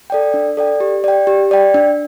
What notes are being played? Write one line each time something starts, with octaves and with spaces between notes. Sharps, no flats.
A4 D5 G5
D4
A4 D5 G5
G4
D5 G5
G4
D5 G5
D4